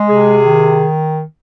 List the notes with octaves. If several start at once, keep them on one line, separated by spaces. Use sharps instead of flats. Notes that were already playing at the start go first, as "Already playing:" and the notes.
Already playing: G#3
C3 G#4
D#3